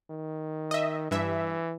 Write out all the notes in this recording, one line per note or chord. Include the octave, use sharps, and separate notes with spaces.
D#3
D#5 E5
G2 E3 E5